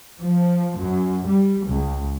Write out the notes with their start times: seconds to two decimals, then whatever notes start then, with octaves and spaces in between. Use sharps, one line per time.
0.20 F3
0.77 F#2
1.27 G3
1.66 C#2